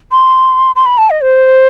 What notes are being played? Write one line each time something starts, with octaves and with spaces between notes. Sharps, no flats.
C6
C6
B5
A5
D#5
C5